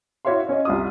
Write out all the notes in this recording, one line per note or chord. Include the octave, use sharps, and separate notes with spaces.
E4 F#4 C#5 E5 F5 C6
C#4 C#5 D#5
C2 F4 D#6